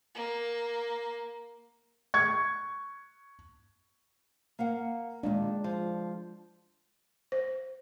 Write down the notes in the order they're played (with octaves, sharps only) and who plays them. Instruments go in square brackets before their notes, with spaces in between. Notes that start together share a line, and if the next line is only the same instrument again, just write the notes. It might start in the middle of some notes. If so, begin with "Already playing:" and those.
[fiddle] A#3
[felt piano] C#6 G#6
[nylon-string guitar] A#3 F5 F#5
[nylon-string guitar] A#2 D#3 [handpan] G#3 D4
[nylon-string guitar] F3
[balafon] C5